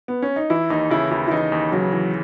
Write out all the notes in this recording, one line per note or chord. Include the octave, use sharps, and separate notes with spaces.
B3
C#4
D#4
E3 E4
D#2 D#4
C#3 E4
D#2 E4
E4
E3 D#4
D#2
C#3 F#3
E3